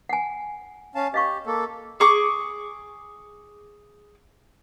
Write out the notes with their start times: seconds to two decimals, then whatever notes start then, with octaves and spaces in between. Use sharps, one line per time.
0.09 F#5 G#5
0.95 C#4 F5 A5
1.14 G4 D#5 F5 C#6
1.46 A#3 A4
2.00 G#4 C#6 D6